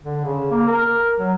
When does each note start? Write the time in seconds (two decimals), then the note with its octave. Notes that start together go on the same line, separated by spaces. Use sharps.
0.03 D3
0.25 C#3
0.51 A#3
0.68 A#4
1.19 F#3